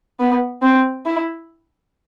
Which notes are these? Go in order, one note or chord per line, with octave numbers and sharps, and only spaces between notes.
B3
C4
E4